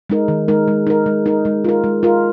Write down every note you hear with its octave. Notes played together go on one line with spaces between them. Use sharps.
G#3 D#4 A#4
D#3
G#3 D#4 A#4
G#3
D#4 A#4
G#3
D#4 A#4
G#3
F4 A#4
G#3
F4 A#4